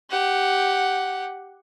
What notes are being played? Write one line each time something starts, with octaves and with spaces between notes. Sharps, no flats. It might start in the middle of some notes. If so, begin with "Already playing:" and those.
G4 F#5